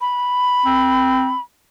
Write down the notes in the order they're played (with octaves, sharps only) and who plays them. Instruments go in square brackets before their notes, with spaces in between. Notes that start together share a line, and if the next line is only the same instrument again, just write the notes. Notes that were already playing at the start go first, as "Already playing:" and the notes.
[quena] B5
[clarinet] C4